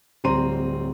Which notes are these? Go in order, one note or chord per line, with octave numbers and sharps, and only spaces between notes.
D1 G3 C4 A#5 C6 D#7